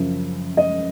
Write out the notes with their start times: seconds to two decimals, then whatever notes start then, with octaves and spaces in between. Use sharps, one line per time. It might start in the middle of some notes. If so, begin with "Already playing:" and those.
Already playing: F#2 C#3 F3
0.57 D#5